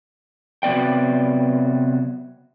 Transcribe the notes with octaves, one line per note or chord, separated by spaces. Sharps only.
C3 F#3 B3 D5 G5